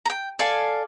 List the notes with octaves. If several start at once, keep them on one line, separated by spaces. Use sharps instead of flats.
G5 A#5
A4 D5 F5 G#5